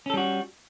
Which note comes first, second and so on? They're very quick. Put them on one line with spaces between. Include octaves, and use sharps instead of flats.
C#4 A4 G3 F#4